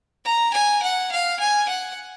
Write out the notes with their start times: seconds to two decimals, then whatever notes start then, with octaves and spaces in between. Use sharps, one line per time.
0.25 A#5
0.53 G#5
0.82 F#5
1.11 F5
1.40 G#5
1.68 F#5